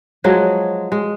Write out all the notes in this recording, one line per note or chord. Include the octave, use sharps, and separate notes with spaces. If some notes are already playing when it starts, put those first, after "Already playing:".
F3 F#3 G#3 G#4
G#3